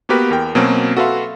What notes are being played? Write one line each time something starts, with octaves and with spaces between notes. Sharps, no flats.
A#3 B3 F#4 G4 A#4 B4
E2 A#4 G5
B2 F#3 A#3 C4 C#4
F#4 A4 B4 E5 F5 C6